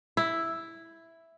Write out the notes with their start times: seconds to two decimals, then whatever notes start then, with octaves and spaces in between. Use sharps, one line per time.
0.17 E4